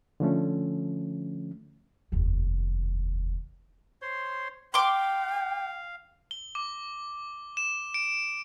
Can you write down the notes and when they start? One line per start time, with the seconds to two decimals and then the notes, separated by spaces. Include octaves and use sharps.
0.20 D3 F3 A3 C#4
2.12 F1 D#2
4.02 C5 C#5 C6
4.74 F5 G5 C6 D6
6.31 G7
6.55 D6
7.57 E7
7.94 D7